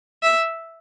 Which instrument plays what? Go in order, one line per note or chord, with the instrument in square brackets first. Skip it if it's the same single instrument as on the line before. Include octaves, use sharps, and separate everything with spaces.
[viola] E5